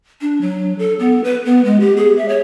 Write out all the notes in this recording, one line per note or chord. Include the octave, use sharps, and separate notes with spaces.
D4
F#3
A4
B3
B4
B3
G#3
G4
G#4
E5
C#5